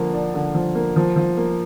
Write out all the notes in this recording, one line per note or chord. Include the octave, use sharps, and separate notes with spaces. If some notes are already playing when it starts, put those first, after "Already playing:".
Already playing: D3 F3 A#3
D4
D3
F3
A#3
F3
F3
A#3